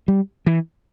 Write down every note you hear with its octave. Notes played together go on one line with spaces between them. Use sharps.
G3
E3